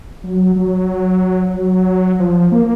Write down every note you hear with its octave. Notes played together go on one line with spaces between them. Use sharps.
F#3
F#3
F#3
F3
A#3